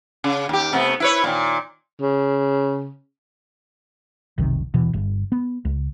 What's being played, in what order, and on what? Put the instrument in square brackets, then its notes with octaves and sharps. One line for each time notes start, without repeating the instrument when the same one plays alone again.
[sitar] C#3
D#2 G4
C3 A3 B3
E4 B4 C#5
A#2 D#3
[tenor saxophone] C#3
[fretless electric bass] F1 B1 C3 D#3
D#1 B2 E3
G1
B3
C#2